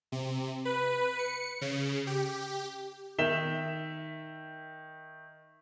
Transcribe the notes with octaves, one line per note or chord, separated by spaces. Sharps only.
C3
B4
C#7
C#3
G4
D#3 E5 B6 E7 G7